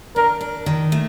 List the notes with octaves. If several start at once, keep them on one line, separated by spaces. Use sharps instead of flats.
D4 A#4
D4
D#3
A3